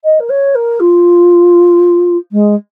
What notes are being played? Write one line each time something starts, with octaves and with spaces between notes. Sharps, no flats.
D#5
A#4
C#5
A#4
F4
G#3